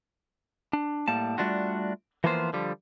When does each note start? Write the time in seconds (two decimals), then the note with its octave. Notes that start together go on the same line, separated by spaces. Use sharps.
0.73 D4
1.08 A2 G3 A#3 A5
1.38 G3 A3 D4 F4 F#4
2.24 E3 F3 A#3 B3 F4 C5
2.53 D3 F3 G3